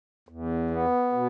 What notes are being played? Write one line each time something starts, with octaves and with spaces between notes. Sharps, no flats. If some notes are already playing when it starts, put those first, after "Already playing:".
E2
B3
B2